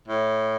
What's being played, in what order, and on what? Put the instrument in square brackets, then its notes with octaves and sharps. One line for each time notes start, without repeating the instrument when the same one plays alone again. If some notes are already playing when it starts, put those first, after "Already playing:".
[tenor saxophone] A2